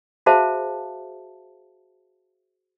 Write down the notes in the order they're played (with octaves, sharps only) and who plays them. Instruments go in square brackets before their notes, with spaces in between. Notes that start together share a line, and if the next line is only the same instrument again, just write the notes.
[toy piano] F#4 G#4 C5 E5 F5 A5